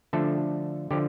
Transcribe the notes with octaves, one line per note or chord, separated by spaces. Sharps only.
D3 F3 A3 D4 A4
D3 F3 G4